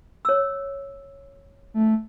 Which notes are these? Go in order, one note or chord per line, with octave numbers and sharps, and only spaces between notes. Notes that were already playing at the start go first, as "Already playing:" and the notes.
C#5 E6
A3